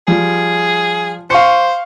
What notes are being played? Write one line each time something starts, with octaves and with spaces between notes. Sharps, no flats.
F3 G3 G#4
C5 F5 C#6 C#7